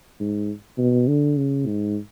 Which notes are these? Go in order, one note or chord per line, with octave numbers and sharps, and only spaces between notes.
G#2
B2
D3
C#3
G#2